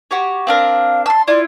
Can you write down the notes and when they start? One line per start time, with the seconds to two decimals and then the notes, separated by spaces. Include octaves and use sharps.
0.11 F#4 G4 C#5
0.47 C4 D4 A#4 F5
1.06 A5 C6 E6
1.28 E4 F4 D5